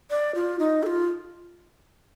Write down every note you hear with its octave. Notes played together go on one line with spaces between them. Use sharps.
D5
F4
D#4
A4
F4